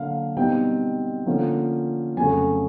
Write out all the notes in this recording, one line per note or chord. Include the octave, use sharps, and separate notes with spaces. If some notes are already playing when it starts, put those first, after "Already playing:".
Already playing: D3 F#3 A#3 F5
B2 G3 C4 D#4 G5
D3 F3 A#3 C#4
F2 C#3 F#3 A3 G#5